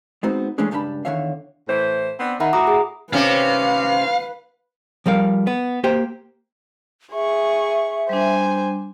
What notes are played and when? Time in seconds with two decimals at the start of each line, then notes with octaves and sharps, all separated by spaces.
0.23 G#3 B3 C4 D#4 F#4
0.58 E3 G#3 A3 C#4 D4 G#4
0.71 C#2 G2 G3 D4 A5 B5
1.05 E2 D3 D#3 C#5 E5 F5
1.68 A2 E3 C5
2.20 B3 C4 D4
2.40 D#3 E5 F#5 B5
2.53 A2 F#4 A#5 D6 D#6
2.67 G#4
3.13 C3 C#4 B4 F5
5.06 F3 G3 A#4 F5
5.47 B3
5.84 A#3 G4 C5 G5
7.13 G#4 E5 C#6
8.09 G3 D4 C5 G#5